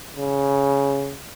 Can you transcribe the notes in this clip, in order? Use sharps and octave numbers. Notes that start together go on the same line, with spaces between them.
C#3